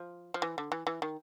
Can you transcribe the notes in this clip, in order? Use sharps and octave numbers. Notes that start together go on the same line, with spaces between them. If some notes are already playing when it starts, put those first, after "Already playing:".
Already playing: F3
F3
E3
D3
E3
E3
D#3